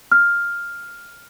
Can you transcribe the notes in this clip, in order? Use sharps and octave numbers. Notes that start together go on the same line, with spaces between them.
F6